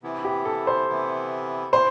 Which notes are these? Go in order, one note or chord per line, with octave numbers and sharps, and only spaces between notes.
C3 E3 B3 E4
G4
A4
C5
C3 E3 B3 E4
C3 E3 B3 E4 C5